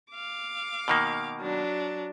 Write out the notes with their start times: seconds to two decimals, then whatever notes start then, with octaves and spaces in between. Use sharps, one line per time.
0.12 F5 D6
0.88 B2 D#3 A#3
1.41 F#3 D4